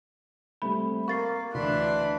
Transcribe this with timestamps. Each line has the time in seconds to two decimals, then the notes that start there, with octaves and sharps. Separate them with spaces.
0.62 G3 A3 C4 B5
1.08 A#3 F5 C#6 A6 C7
1.54 D2 E3 D4 B5 C6 F#6